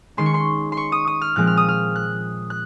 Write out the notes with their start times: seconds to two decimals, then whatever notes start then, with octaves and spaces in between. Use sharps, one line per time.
0.17 D#3 G#3 C#4 C6
0.26 C#6
0.34 C6
0.72 C6
0.77 C#6
0.92 D#6
1.07 D#6
1.21 F6
1.36 A#2 F3 G#3 C4 F#6
1.47 F6
1.57 D#6
1.68 F6
1.96 F#6
2.50 F#6